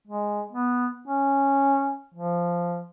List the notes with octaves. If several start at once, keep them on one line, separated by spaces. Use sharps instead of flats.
G#3
B3
C#4
F3